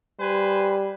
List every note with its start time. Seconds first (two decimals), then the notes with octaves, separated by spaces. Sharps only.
0.20 G3 B4 C5 G#5